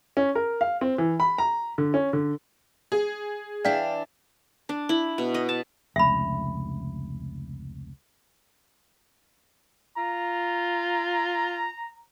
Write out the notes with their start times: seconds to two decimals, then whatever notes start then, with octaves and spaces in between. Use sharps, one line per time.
0.17 C#4
0.35 A#4
0.61 F5
0.81 C4
0.98 E3
1.20 B5
1.38 A#5
1.78 D3
1.94 C#4
2.13 D3
2.92 G#4
3.65 E3 D4 D5 F5 G5 B6
4.69 D4
4.89 E4
5.18 B2
5.34 D#5
5.49 A5
5.96 F1 C#2 E5 B5
9.97 F4 A#5